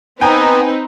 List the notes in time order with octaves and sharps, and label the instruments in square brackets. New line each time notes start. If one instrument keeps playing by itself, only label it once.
[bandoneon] B3 [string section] C4 D#4 B4 [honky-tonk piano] G5 G#5 A#5